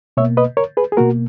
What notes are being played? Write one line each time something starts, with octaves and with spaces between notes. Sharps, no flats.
B2 A#3 C#5 E5
B4 D#5
A#4 C#5
G#4 B4
G#4
B2 A#3 F#4 A#4